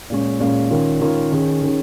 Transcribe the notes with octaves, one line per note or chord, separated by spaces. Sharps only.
A#2 G#3 C#4
A#2 G#3 C#4
D#3 C#4 F4 A#4
D#3 C#4 F4 A#4
D#3 C#4 G#4
D#3 C#4 G#4